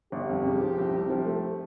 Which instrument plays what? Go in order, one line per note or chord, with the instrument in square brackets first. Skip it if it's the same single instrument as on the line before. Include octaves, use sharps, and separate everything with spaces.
[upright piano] G1 [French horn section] G4
[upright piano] F2
C#3
F3
C2
C3
F3
A3